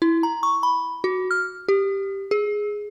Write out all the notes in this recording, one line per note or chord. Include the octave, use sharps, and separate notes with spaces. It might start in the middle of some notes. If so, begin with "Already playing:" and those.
E4
A#5
C#6
B5
F#4
F6
G4
G#4